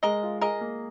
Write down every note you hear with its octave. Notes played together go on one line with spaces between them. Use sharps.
G#3 A#4 D#5
F4
G#4 A#4 D#5
A#3